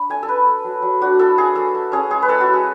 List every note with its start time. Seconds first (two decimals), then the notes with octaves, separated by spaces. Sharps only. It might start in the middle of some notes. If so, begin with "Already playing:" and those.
Already playing: D4 B5
0.10 A3 G#5
0.23 A4
0.28 A3 B4
0.47 A3
0.64 F#3
0.82 F#3
1.01 D4 F#4
1.19 E4 A4
1.38 E4 G#4
1.55 A3 A4
1.75 A3
1.92 C#4 G#4
2.10 G#3 G#4
2.22 B4
2.28 G#3 A4
2.40 F#4
2.47 E4
2.54 G#4